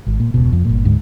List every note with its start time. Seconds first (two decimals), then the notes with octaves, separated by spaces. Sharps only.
0.06 G#1
0.20 A#2
0.34 E1 C#2 B2
0.53 F2
0.65 G1 A#2
0.85 D2 G#2